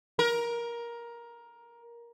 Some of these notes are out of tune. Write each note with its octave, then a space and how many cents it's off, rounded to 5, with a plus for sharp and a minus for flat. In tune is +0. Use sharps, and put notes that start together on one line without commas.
A#4 +15